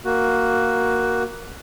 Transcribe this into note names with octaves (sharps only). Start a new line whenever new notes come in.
A#3 F#4